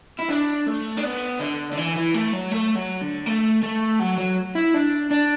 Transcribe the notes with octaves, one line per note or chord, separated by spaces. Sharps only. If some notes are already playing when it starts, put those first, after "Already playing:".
E4
D4
A3
D4
B3
D3
D3
E3
E3
A3
F#3
A3
F#3
D3
A3
A3
F#3
F#3
E4
D4
D4